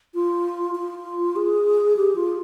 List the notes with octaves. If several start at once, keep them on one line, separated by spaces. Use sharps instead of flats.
F4
F4
G#4
G4
F4